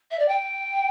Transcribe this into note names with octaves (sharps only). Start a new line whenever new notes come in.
E5
D5
G5